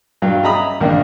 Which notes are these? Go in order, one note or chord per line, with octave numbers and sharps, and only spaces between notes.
G2 F#3 F5 G5
D#5 E5 A#5 B5 D#6
A#1 D#3 A#3 D4